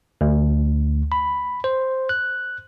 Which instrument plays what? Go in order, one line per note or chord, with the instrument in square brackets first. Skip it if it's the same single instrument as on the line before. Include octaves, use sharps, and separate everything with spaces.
[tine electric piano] D2
B5
C5
F#6